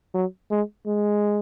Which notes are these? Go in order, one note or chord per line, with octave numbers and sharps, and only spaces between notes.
F#3
G#3
G#3